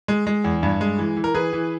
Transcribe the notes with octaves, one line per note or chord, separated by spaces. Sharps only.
G#3
G#3
E2
G2
G#3
E3
E3
A#4
E3 G#4 B4
E3